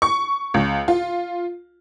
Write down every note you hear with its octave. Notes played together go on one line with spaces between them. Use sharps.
C#6
C#2
F4